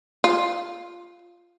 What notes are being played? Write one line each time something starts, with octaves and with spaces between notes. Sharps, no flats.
F4